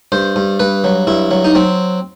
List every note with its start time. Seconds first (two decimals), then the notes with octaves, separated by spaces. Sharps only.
0.12 G2 C5
0.36 G2
0.59 G2 B4
0.84 F#3
1.07 G2 E4
1.31 F#3
1.44 D#4
1.55 F#3 C4